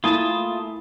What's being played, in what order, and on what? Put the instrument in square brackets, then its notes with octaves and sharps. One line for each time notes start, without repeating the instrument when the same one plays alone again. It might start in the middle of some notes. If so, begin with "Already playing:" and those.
[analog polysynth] A3 A#3 [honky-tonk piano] E4 B5 D#6 [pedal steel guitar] F4 G#5 A5